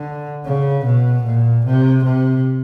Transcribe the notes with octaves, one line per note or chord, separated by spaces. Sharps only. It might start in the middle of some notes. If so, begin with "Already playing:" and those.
Already playing: D3
C#3
B2
A#2
C3
C3